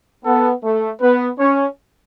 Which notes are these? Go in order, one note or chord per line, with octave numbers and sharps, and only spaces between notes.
B3 A4
A3
B3 B4
C#4 C#5